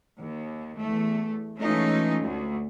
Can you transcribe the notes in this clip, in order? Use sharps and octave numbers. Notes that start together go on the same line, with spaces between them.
D#2
E2 A3
E3 G#3 A3 C#4 D#4 F4
D2